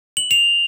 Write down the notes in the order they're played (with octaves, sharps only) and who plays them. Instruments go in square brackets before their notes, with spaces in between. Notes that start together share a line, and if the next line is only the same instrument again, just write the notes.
[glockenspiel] F#7
F7